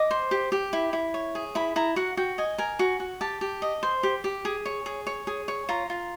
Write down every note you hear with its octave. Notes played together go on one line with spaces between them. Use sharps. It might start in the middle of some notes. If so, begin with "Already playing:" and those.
Already playing: D#5 D6
C5
G4
G4
E4
E4
C#5
G#4
E4 B5
E4 A#5
F#4 F#5
F#4 G5
D#5 G#5
A#4 G#5
F#4
F#4
G4 A5
G4
D#5
C5
G4
G4
G#4
C#5
G#4
C#5
G#4
C#5
F4 A#5
F4